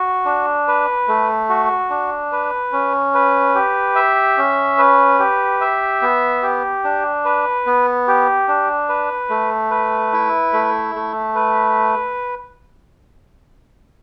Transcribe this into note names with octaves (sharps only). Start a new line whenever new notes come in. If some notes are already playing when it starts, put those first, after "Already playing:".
Already playing: F#4
D4
B4
A3
F#4
D4
B4
C#4
B4
G4
E5
C#4
B4
G4
E5
B3
G4
D4
B4
B3
G4
D4
B4
A3
B4
E4
A3
A3
B4